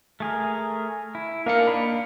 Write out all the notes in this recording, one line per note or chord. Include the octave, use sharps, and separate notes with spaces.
A3 G#4 A#4
E4
A#3 D4 D#4 A#4 F5 C#7
B5